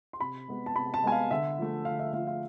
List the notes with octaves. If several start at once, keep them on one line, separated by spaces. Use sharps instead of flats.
C6
C3 B5
G#3 B3
A5
C3 B5
A5
G#3 B3 G#5
F5
D3 E5
F3 A3
D3 F5
E5
F3 A3 F5
F5